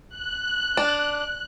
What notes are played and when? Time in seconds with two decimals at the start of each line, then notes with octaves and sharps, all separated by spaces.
0.15 F#6
0.77 D4